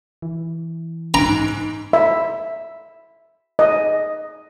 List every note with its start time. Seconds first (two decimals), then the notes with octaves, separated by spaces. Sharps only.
0.22 E3
1.14 G#2 A#5 D7
1.93 E5
3.59 D#5